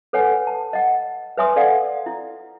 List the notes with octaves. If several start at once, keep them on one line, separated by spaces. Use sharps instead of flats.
A4 B4 C#5 F#5 G#5
A5
D#5 F#5
B4 C#5 E5 G#5 C6 D#6
A4 D5 F5 F#5
E4